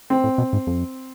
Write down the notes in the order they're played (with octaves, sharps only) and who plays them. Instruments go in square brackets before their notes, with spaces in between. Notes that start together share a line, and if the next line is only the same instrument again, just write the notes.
[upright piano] C4
[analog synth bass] A2
B2
G#2
F2